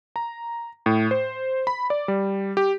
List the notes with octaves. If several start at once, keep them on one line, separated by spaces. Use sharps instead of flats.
A#5
A2
C5
B5
D5
G3
G4